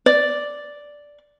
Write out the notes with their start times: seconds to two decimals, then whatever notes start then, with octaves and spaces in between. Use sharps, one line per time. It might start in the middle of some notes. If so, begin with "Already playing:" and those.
0.06 D5